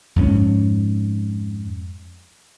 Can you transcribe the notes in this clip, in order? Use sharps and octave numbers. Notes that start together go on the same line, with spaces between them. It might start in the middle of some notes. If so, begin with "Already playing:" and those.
F2 G#2 G3 C#4